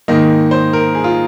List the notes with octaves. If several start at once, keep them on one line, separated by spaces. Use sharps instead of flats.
G#2 D#3 A#3 D#5
C5
A#4
G#4
F4